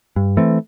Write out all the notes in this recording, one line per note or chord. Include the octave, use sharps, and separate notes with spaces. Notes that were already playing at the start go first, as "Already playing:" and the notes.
G2
E3 A3 C4